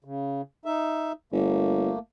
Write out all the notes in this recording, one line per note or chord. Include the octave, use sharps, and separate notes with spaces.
C#3
D#4 E5
G1 A3 A#3